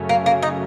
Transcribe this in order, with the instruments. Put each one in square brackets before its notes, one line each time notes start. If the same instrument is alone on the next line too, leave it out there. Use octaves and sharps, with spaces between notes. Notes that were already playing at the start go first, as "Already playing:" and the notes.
Already playing: [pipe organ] F#2 C#3 F#3 A3 C#4
[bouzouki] A#3
A#3
D#4